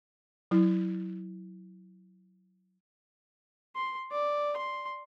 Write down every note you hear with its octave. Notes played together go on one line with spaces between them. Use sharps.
F#3 E4
C6
D5
C6